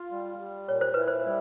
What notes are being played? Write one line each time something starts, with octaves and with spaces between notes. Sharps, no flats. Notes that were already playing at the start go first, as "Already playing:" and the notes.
Already playing: F4
G3
G3
A#2 C#5
C5
E4 B4
C5
G3